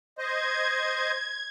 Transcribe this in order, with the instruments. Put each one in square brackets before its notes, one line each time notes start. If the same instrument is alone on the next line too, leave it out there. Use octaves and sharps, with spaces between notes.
[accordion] C5 D#5 [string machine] G#6